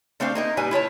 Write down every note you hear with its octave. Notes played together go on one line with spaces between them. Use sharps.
A3 C4 D4 C5 F5
A#3 D#4 A#4
A#2 G3 B4 G#5
E4 F4 C#5 A5